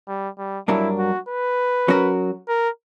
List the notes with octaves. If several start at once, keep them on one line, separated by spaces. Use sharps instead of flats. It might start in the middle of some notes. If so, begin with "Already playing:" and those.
G3
G3
G2 F#3 A#3 D4 E4
F#4
B4
F#3 C#4 F#4 A#4
A#4